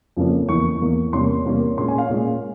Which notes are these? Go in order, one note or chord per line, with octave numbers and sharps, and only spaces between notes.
F2 C#3 F3 A#3 C#4
E2 E3 A#3 C#6
E2 E3 A#3
E2 C3 G3 A#3 C#4 C6
E2 C3 G3 A#3 C#4
A#2 G#3 C#4 C6
G#5
F5
A#2 G#3 C#4